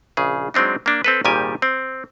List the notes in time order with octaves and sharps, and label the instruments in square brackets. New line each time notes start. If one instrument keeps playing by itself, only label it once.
[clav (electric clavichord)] A#1 C#3 G#4
F#3 G#3 C4 D4 D#4
A#3 D4
C4 A4 B4
G#1 A#2 D#3 G3 G4 G#5
C4